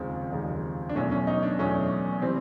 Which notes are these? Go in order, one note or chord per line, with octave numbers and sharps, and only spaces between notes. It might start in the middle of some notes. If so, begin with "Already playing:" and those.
Already playing: F1 D#2 C#3 F3 G#3 C4
F1 D#2 C#3 F3 G#3
D4
E2 B2 F#3 A3 C#4
C#4
D#4
D4
E2 B2 F#3 A3 C#4
C3 E3 G3 C4